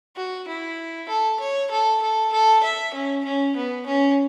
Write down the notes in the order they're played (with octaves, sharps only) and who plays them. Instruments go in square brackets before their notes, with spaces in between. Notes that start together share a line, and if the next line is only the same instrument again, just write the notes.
[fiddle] F#4
E4
A4
C#5
A4
A4
A4
E5
C#4
C#4
B3
C#4